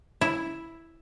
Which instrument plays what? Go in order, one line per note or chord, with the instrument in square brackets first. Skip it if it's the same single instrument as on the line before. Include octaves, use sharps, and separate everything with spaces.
[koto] E4